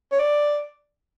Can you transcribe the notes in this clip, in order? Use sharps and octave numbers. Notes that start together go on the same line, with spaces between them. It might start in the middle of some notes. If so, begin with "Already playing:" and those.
C#5
D5